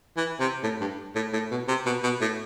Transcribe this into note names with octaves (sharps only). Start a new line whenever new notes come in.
E3
C3
A2
G2
A2
A2
B2
C3
B2
B2
A2